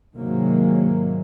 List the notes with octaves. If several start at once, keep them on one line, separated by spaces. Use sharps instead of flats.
G#2 C3 D#3 F#3 G#3 A#3